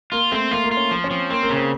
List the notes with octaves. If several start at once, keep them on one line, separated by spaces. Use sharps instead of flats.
A#3 F4
A3 C4
A#3 F4
A#3
F4
C#4
F3
C#4
F3 C4
A#3 C4
A#3
C#3
C4